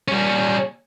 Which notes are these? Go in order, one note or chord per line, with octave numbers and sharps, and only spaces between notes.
G3 C#4